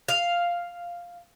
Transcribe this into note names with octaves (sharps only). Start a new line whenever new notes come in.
F5